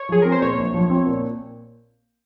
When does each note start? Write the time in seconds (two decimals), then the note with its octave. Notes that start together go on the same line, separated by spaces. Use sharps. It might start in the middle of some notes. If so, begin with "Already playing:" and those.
Already playing: C#5
0.09 F3 G#4
0.22 C4 A#4
0.32 C5
0.42 A#2 C#5
0.58 A#1
0.74 F3
0.90 C4
1.06 A#2